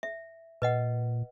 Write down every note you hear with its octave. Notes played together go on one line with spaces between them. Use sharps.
E5
A#2 B4 D#5 F#5